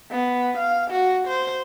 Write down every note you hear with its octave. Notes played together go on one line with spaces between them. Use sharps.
B3
F5
F#4
C5